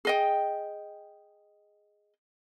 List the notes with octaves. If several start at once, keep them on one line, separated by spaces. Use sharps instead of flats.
G#4 D#5 G5